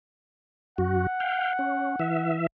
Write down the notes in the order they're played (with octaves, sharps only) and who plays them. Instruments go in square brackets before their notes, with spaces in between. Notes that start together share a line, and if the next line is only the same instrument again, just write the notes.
[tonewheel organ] F#2 F#4 [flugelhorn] F#5
[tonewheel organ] F5 G5
C#4
E3 E5